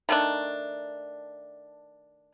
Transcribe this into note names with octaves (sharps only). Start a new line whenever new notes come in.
D#3 A3 D4